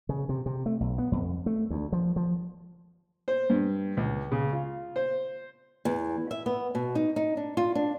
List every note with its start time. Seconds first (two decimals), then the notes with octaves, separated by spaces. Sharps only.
0.09 C#3
0.29 C3
0.46 C3
0.66 A3
0.80 B1
0.98 B3
1.12 F2
1.46 A3
1.70 D2
1.92 F3
2.16 F3
3.28 C5
3.50 G2
3.97 C#2
4.31 C#3
4.53 F4
4.96 C5
5.85 E2
6.31 E5
6.46 B3
6.75 B2
6.95 D#4
7.16 D#4
7.37 D4
7.57 F4
7.75 D4